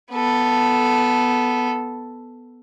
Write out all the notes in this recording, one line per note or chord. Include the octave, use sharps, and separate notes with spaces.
B3 A4